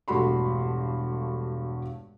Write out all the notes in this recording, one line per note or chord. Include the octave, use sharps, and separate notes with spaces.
E1 G2 A3 F#4 B5 C6